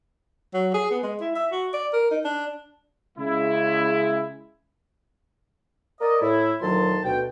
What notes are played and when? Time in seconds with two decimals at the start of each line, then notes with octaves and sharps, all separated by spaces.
0.54 F#3
0.74 G#4
0.91 B3
1.03 G#3
1.21 E4
1.35 E5
1.52 F#4
1.74 D5
1.93 A#4
2.11 D#4
2.25 D4
3.18 C#3 G#3 E4
6.00 A#4 D5 D#5
6.21 A2 E4
6.61 D2 A#2 D#3 F#3 A5 C6
7.04 D2 B2 G5